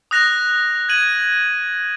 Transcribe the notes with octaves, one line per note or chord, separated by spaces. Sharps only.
D#6 F#6 A#6 F7
G#6 D#7 F#7